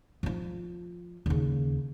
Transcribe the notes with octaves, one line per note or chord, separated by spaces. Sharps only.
F3 F4
D#2 C#3